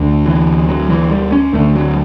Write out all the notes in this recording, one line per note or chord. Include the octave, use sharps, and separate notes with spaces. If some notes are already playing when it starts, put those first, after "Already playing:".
Already playing: D2 D3 A3
E3
F#3
E3
G3
C#4
D2 D3 A3
F#3